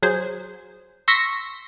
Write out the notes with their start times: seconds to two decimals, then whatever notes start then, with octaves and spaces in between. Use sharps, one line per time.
0.02 F#3 G#4 C5
1.08 C6 C#6 E6 A#6 B6